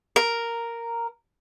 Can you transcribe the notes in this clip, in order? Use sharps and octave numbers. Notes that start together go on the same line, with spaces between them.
A#4